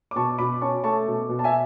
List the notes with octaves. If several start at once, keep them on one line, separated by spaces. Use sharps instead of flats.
D6
B2 A5 C#6
B2 B5 D6
C#4 A5 C#6
A3 A5 C#6
B2
B2
A5
E5 G#5